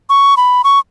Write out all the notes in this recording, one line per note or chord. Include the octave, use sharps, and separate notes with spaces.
C#6
B5
C#6